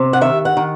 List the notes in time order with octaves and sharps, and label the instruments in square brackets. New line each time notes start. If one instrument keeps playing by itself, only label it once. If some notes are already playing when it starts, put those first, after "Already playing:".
Already playing: [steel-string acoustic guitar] C3
F#5
D#3 E5
F#5
D#3